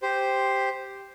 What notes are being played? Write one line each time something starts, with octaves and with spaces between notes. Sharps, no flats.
G4 C5